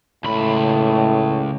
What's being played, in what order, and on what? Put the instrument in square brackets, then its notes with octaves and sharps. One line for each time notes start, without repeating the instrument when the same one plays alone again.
[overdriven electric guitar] C#2 B5 [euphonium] A2